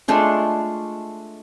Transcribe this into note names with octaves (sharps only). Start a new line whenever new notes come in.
G#3 A3 D4 F4